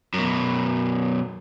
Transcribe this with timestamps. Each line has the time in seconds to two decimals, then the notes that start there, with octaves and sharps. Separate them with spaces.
0.14 F#2 B2